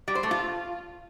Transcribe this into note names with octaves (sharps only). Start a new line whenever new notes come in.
G3
C5
A3
F4